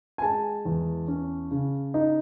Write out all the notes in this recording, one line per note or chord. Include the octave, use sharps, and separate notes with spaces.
G#5
G#3 A5
E2
C#4
C#3
D#4